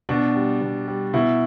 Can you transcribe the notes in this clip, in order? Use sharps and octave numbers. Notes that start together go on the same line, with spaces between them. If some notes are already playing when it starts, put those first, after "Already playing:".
B2 D4
G3
B2
G3
B2 E4